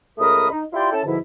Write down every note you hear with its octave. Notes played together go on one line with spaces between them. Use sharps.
C#2 A3 A#4 A#5 B5 D#6
D#4
E4 F4 G4 D5 G5 C6
C#4 E4 A4 A5
G#2 B2 D3 F3 E4